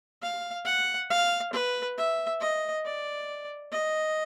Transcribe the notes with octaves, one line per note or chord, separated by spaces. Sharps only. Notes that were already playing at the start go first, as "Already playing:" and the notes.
F5
F#5
F5
B4
E5
D#5
D5
D#5